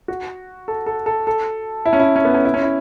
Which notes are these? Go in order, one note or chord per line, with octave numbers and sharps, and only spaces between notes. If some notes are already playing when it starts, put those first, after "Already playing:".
F#4
A4
A4
A4
A4
E4
C#4
E4
C#4
B3
C#4
E4
C#4
E4